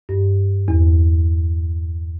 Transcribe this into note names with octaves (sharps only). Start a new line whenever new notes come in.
G2
E2